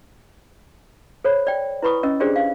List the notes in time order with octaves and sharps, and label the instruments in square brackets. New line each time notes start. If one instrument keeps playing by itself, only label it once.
[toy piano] A4 C5 C#5 B5
D5 G5
E4 B4 B5 C#6 D#6
C#4 D#5 E6
D4 F4 G4 G#4 C5 D5
F5